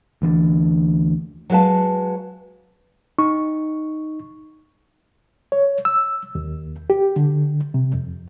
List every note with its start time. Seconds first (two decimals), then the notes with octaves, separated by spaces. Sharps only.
0.22 D2 E3 C4 D4
1.50 F#3 G#3 F#4 B4 F5 A5
3.18 D#4 C#6
5.52 C#5
5.85 E6
6.35 D#2
6.90 G4
7.16 D3
7.74 C3
7.94 F2